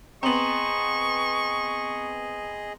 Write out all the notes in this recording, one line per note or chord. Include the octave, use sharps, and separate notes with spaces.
B3 C4 G#4 D#5 A#5 C6 C#6 F#7